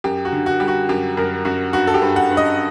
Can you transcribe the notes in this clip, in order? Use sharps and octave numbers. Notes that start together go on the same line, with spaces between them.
F#2 G4
F#4
D3
F#4
G3 G4
F#4
F#2 G4
F#2 A#4
F#2 F#4
G2 F#4
A4
G4
G2
F#5
G2
D#5